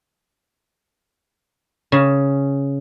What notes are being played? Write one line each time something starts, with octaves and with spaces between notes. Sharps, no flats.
C#3